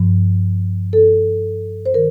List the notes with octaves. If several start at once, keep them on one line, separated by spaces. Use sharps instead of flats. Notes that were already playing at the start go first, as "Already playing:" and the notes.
Already playing: G2 F3
A4
C5
D#3 A#4